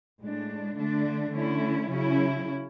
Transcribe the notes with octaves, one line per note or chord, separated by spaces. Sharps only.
A2 G#3 D4
D3 A3 D4
D3 A3 C#4 E4
C#3 F#3 C#4 E4